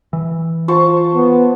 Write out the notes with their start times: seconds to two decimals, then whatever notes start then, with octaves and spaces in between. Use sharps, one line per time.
0.13 E3
0.68 F4 C5 A5 C#6
1.14 B3